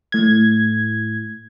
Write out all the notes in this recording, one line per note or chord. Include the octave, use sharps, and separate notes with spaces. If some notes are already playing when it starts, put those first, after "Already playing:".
A2 G#6